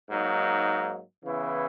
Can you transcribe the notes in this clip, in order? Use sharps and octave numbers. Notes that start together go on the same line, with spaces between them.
G#2 F#3 A#3 D#4
C#3 E3 B3 E4